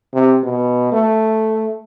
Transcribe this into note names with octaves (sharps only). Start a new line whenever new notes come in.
C3
B2
A3